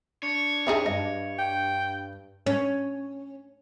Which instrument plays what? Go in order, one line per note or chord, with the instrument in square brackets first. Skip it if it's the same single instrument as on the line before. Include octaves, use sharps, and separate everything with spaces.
[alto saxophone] D4 [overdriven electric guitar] C#5
[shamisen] C4 D#4 G#4 [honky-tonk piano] E5 G5 A5
[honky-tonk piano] G2 [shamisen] D#5
[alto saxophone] G5
[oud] C#4